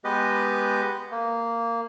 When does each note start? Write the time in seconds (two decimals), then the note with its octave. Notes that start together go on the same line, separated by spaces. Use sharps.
0.04 G#3 B3 G4 B4 D#5
1.11 A#3